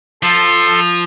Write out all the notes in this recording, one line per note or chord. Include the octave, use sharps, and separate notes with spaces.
F3 A4 C6